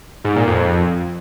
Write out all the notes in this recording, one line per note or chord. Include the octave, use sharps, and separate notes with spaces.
G#2
A#2
F2